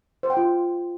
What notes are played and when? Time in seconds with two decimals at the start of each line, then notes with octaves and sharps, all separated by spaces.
0.23 C5
0.30 G5
0.37 F4